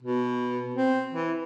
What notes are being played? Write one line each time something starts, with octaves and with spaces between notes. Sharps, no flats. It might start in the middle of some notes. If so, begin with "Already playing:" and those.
B2
C4
E3